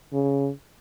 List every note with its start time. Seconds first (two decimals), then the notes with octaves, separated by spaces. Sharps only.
0.13 C#3